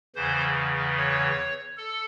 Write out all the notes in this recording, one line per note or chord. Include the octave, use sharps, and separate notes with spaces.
E2 C#3 E3 C5
C#5
A4